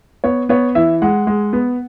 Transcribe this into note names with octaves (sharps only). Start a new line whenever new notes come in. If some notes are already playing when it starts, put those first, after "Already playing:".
B3 C#5
B3 C#5
E3 E5
G#3 F#5
G#3
B3